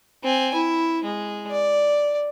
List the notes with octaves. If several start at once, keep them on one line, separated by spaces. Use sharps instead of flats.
C4 G#5
E4
G#3
D5